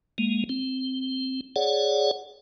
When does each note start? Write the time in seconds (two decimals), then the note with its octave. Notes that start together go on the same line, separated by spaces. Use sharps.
0.18 G#3 A#3
0.49 C4
1.56 G#4 C#5 D5 F#5